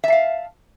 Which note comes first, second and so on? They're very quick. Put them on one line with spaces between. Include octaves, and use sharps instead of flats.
E5 A5 F5